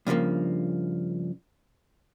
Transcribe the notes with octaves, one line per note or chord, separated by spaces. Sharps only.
G2 C#3 E3 F3 A#3